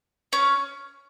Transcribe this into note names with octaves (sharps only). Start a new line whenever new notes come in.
C#4